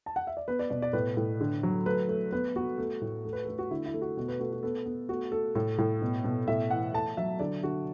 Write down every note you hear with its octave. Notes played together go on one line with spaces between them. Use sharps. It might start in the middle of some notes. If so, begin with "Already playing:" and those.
A5
F#5
E5
D5
B3 B4
D5
B2 D5
D5
A2 B4
A2
D3
F#3
A3 B4
A3
B3 B4
B3 F#4
A3
A2
A3
B4
A3 A4
F#4
D3 E4
E4
A3
F#4
B2 F#4
B4
A3 F#4
F#4
B3 A4
B3
A3 F#4
A3 A4
A2 A4
A2
B2
B2
A2 E5
E3 F#5
A3 A5
F#3 E5
D3 D5
D3 F#4